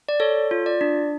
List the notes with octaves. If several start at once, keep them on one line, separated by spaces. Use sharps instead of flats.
D5
A4 C#5
F4
D5
D4